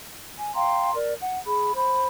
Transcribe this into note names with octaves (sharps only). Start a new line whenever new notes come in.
G#5
F5 G5 A#5 C6
A#4 D5
F#5
G#4 B5
C5 B5